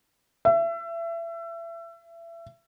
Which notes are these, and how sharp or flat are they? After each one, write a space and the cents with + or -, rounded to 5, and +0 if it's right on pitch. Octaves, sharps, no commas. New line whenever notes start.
E5 +30